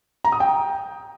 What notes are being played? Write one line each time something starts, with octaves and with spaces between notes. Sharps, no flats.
A#5
D#6
G5